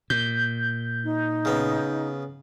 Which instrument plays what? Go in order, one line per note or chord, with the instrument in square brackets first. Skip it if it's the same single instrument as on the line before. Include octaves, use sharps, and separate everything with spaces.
[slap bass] A#2 [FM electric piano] G6
[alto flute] D#4
[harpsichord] C#3 B3